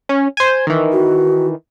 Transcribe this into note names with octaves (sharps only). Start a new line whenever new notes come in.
C#4
C5 G#5
D#3 E3
F#4